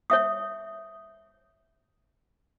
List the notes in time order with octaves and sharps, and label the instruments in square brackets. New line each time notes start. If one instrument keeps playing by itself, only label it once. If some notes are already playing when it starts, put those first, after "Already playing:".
[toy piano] C#5 E5 D#6